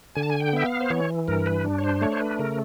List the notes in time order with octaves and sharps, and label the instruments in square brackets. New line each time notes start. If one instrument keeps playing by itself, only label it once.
[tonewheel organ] D3 G#5
A5
G#5
G5
B3 E5
F5
C5
E3 C#5
G2 A#4
B4
D4
C#5
C5
A3 C#5
C5
B4
C#3 A#4